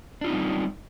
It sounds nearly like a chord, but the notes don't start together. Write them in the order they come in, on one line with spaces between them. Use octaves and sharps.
D4 F4 D#4 C4 G3